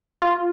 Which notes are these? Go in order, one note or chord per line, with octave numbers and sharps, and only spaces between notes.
F4